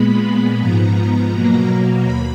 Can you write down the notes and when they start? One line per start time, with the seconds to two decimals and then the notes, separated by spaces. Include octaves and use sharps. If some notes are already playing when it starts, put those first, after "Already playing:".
Already playing: A#2 G#3 B3 B5
0.23 B5
0.59 G#2 F3 B3 A#5
1.32 B2 F#3 A#3
2.04 D#2 B5